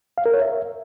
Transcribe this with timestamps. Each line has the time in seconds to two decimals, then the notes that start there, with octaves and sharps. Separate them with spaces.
0.18 F5
0.26 A#4
0.34 C#5
0.42 E5